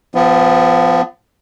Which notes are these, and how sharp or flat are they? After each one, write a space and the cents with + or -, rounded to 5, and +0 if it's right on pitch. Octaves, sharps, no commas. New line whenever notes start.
F3 -5 B3 +30